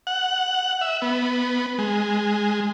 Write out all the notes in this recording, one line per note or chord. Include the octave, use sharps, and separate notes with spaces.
F#5
E5
B3
G#3